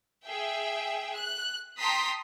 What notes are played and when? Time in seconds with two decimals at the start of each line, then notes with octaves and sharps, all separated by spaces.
0.25 G#4 E5 G5
1.16 F#6
1.78 G5 A5 A#5 C6 D#6 B6